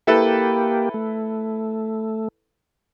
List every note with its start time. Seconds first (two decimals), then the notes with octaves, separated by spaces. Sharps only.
0.07 A#3 E4 G4 A4 B4
0.94 A3